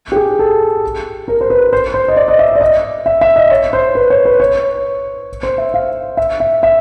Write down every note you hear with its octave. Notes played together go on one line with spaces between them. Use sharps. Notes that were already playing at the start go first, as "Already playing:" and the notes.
G4
G#4
A4
A#4
C5
B4
C5
C5
D#5
D5
D#5
E5
D5
D#5
E5
E5
D#5
C#5
C5
B4
C#5
B4
C#5
C5
E5
F5
E5
E5
E5